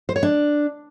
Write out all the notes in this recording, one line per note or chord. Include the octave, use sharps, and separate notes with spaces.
C5
C#5
D4